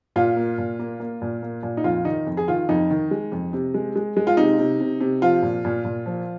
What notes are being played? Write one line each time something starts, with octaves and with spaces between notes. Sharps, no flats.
A#2 F4
A#3
A#2
A#3
A#3
A#2
A#3
A#2
D#4
F2 F4
D#3 D#4
F2
G#4
D#3 F4
F2 D#4
D#3
G#3
F2
C3
G#3
G#3
G#3
F4
C3 D#4
C3
C3
C3
F3 F4
A#2
A#2
A#2
F3